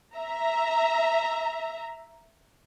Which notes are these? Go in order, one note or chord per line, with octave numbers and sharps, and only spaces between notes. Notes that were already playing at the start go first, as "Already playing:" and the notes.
E5 A#5